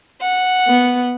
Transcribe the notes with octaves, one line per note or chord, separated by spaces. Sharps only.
F#5
B3